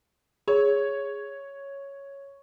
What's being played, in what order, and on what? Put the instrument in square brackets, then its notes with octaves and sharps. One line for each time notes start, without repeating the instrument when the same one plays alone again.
[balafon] G#4 [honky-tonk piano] C#5